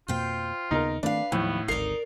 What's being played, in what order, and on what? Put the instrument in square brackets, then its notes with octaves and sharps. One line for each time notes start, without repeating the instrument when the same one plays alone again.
[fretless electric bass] F2 B2 A#3 [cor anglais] F4 [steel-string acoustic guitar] C5 G5
[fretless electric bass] D#2 C#3 B3 [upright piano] D#4 A#4
[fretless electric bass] D#3 A3 C4 [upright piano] D4 [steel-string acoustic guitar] B4 F5
[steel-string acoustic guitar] D#2 [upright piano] A2 [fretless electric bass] F3 F#3 [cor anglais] B3
[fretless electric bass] G#1 D2 [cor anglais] D#4 [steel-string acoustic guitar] A#4 D5 [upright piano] C7